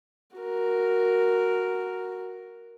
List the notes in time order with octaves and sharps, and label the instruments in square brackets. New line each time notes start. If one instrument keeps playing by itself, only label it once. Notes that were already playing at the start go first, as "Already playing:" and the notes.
[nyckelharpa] F#4 A#4